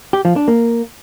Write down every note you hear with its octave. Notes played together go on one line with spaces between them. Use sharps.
G4
F3
D4
A#3